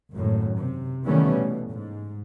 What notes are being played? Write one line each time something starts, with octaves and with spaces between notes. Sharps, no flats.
G#1 F#2 A2
C3
D#3 E3 G3 A3 B3 C#4
B2
G#2